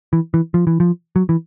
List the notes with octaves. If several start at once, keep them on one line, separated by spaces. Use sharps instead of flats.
E3
E3
F3
E3
F3
F#3
E3